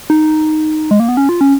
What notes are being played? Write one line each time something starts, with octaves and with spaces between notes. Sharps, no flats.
D#4
G#3
A#3
B3
C#4
F4
C#4